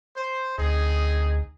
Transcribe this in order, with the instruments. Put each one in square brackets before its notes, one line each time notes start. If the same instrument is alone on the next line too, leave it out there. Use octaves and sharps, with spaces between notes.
[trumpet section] C5
[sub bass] D2 [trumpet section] C4 D#4 G#4